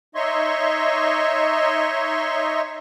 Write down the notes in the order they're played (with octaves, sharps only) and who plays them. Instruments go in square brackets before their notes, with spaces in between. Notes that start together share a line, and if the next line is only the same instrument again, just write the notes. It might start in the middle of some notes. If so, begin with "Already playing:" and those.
[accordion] D#4 C#5 D#5 E5 C6 C#6